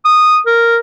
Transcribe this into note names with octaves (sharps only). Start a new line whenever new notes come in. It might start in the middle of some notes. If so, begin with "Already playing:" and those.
D#6
A#4